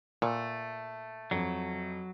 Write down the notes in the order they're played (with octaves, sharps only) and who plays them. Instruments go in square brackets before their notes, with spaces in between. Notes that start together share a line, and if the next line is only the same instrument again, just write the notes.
[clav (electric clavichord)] A#2 [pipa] A3
[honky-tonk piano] F2 [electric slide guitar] F#3